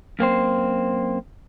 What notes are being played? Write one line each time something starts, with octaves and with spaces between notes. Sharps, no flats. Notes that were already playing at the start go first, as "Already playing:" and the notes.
F#2 A#3 C4 C5